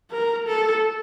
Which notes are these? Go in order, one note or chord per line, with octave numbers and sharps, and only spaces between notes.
A#4
A4